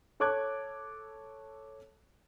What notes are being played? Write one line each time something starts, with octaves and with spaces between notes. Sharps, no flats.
A4 C#5 A5 D6 F#6 G#6